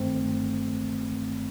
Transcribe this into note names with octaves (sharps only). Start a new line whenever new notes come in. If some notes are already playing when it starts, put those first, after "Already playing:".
Already playing: G1 G2 D#3 A3 C4